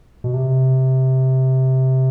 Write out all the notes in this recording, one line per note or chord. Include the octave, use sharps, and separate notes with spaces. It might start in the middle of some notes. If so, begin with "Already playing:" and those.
B2
C3